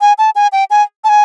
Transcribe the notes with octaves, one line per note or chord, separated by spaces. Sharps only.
G#5
A5
G#5
G5
G#5
A5
G#5